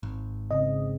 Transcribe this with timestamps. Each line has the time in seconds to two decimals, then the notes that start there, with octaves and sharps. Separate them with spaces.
0.03 G#1
0.51 C#3 C4 D#5